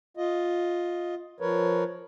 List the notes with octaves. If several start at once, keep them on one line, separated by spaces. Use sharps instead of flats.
F4 D#5
F3 A#4 B4 C#5